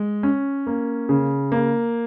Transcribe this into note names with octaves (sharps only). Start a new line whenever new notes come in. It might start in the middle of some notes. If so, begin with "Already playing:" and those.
Already playing: G#3
C#4
A#3
C#3
A#3